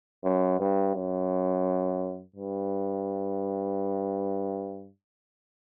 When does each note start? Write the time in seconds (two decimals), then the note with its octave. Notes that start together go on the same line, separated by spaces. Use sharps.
0.24 F#2
0.60 G2
0.95 F#2
2.36 G2